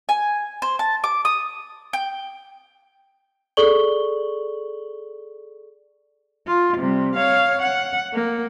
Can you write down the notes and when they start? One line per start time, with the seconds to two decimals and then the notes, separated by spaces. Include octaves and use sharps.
0.09 G#5
0.62 C5
0.79 A5
1.04 D6
1.25 D#6
1.93 G5
3.57 G#4 A4 D5 C#6 F#7 G7
6.47 F4
6.77 C3 G3
7.16 C#5 F5
7.62 F#5
8.13 A#3